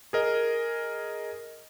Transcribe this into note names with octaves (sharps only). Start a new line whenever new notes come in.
G#4 A#4 D#5